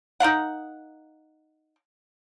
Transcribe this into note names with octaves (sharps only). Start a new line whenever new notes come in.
D#4 A#4 F5 F#5